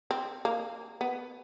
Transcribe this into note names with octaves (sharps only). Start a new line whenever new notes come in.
C4
A#3
B3